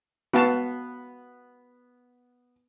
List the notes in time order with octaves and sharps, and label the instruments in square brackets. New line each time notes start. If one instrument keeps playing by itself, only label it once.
[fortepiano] B3 [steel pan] F#4 F5 A5